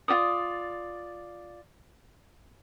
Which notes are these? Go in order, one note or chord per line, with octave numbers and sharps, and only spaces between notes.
F4 F#4 D5 D#6